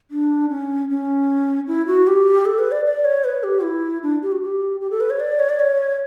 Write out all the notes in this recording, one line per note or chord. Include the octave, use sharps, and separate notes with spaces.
D4
C#4
C#4
E4
F#4
G4
A4
B4
D5
D5
C#5
B4
G4
E4
D4
G4
F#4
G4
G4
A4
B4
C#5
D5
C#5
D5
C#5